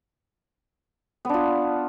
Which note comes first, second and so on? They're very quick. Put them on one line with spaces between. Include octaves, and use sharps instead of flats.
B3 D4 F4